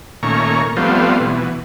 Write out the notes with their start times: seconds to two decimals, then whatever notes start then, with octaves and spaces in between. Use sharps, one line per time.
0.23 A#2 D#3 A3 C#4 A#5 C#6
0.77 F3 G3 A3 B3 C4 F4
1.21 B2 E3